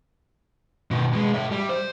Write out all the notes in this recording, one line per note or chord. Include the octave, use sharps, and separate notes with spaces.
B2 D#3
B2 G#3
C#5 E5
G3
C5